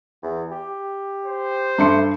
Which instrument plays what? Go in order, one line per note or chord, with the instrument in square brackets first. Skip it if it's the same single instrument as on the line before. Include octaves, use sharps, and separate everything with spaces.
[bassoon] E2
G4
[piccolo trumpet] C5
[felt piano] G2 C6 C#7 [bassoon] A3